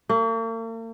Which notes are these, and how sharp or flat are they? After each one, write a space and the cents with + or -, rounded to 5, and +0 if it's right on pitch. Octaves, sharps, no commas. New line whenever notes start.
A#3 -45